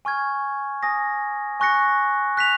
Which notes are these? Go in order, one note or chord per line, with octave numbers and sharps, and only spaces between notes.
G#5 C#6 F6 G#6
G#5 D#6 A#6
G#5 C#6 F#6 A#6 C#7
F#6 B6 F7